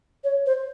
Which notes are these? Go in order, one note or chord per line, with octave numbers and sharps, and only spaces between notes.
C#5
C5